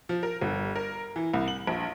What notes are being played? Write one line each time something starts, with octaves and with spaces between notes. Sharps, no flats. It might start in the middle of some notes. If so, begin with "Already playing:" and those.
F3
A#4
G1
A#4
E3
C2
F#7
A#1